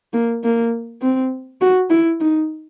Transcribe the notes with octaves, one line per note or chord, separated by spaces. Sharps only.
A#3
A#3
C4
F#4
E4
D#4